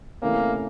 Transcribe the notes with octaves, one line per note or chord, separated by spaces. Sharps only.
C3 E3 A3 A#3 C#4